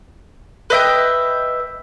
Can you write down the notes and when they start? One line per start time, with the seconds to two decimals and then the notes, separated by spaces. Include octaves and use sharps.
0.70 B4 D#5 E5 G5